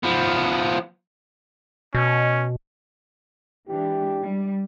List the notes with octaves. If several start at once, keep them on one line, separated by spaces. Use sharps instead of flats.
F3 B3
B2 C#4
E3 G#3 D4 G4
G3